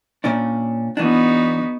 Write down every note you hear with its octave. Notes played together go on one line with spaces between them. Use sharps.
A#2 C#4 D4
E3 B3 D4 D#4 F#4